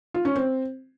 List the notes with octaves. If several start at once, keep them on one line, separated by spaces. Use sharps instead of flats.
F4
C#4
C4